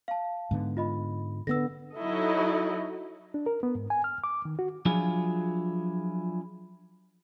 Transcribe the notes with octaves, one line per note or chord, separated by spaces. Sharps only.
F5 A5
G#2 D3 B3
F4 D#5 B5
D3 B3 E6 A#6
F#3 D#4 E4 F#4 A4 D#5
D4
A#4
B3
G#2
G#5
F6
D6
D#3
F#4
F3 F#3 D4 E4 F4 G#4